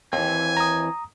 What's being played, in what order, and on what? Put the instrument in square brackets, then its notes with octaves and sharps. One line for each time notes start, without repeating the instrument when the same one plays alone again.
[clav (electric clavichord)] D#2 [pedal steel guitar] E3 C4 [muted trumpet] G#5
[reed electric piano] A#5 D#6